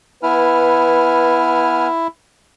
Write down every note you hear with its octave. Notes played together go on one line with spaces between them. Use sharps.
B3 E4 B4 G#5 F6